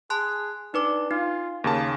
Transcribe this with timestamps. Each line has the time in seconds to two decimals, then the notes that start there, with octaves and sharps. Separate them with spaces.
0.10 G#4 A5 C6 F#6
0.74 D4 D#4 B4 D6
1.11 D#4 F4
1.64 D#2 C#3 A#3 A5